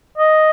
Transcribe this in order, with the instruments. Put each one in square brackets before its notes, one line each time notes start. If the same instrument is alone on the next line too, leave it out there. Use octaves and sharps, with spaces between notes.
[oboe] D#5